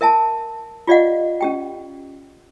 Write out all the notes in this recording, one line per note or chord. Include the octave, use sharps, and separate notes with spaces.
A#4 E5 G#5 A5
F4 G4 D5 D#5 F5 F#5
C#4 G4 G5